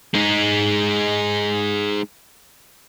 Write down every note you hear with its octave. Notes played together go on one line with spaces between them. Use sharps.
G#3 D#4